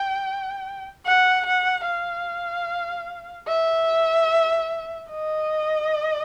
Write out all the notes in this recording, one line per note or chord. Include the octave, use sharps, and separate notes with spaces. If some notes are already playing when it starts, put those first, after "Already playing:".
Already playing: G5
F#5
F#5
F5
E5
D#5